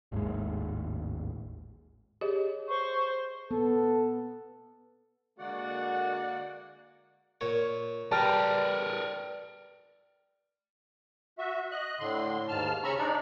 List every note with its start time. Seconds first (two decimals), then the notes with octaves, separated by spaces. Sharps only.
0.12 G#1 D#2 A2 G#3
2.21 G4 G#4 C#5 D#5
2.69 C5 C#6
3.51 B3 A4
5.38 D3 G#3 A#3 F#4 D5 F#5
7.41 A#2 C#5
8.12 G3 A#4 B4 D5 G5 A5 A#5 F6
11.38 F#4 E5
11.71 D#5 F#6
12.00 A2 D3 C6
12.48 D#2 G#2 A5 F6
12.83 C#3 C#4 A#5 B5 C#6 E6
12.98 D4 D#4 D5